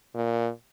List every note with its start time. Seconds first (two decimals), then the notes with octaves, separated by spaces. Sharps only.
0.15 A#2